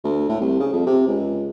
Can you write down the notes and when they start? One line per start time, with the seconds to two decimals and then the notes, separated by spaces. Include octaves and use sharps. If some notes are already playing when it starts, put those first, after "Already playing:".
0.04 D2
0.29 A2
0.40 C2
0.59 C#3
0.73 F2
0.86 C3
1.07 C#2